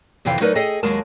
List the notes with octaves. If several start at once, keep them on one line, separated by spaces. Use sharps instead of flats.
F2 C3 E3 F5 G5
F#3 A3 D#4 A#4 B4 D5
G#4 A4 D#5 G5
D#2 F#3 G#3 A#4 A5